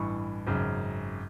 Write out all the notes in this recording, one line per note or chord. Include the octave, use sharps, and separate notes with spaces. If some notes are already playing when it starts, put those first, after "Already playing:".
Already playing: A1 G2 E3 C#6
G#1 F#2 C#3